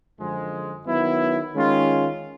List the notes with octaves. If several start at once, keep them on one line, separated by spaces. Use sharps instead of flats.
F#2 D3 F3 G#3
D#3 F#3 B3 E4
D#3 G#3 C#4 F4